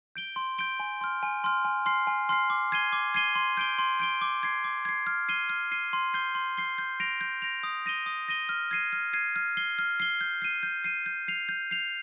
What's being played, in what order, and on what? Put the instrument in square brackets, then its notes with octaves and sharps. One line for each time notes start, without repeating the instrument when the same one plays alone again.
[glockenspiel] G6 D7 G7
C6
G6 D7 G7
G#5
C6 F6
G#5
C6 F6
G#5
C6 F6 C7
G#5
C6 F6 C7
D6
G#6 C7 D#7 G7
D6
G#6 C7 D#7 G7
C6
G6 D7 G7
C6
G6 D7 G7
D6
G#6 C7
D6
G#6 C7
F6
C7 D#7 G7
F6
C7 D#7 G7
C6
G6 C7 G7
C6
G6 C7 G7
G6
A#6 D7 F7
G6
A#6 D7 F7
D#6
A#6 D#7 G7
D#6
A#6 D#7 G7
F6
G#6 C7 D#7
F6
G#6 C7 D#7
F6
C7 G7
F6
C7 G7
G6
C7 D#7
G6
C7 D#7
G6
C7 F7
G6
C7 F7